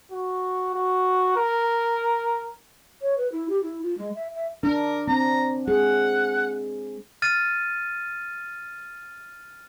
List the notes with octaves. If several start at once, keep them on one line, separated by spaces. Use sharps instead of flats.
F#4
F#4
A#4
C#5
B4
E4
G4
E4
F4
G#3
E5
E5
D4 A#4
C4 A#5
G#3 G#4 F#5
F6 A6 D#7